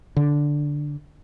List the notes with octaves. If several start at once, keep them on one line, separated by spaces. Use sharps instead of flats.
D3